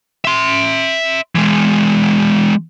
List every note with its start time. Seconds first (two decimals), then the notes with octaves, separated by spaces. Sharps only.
0.25 E5 C6
1.35 E3 G#3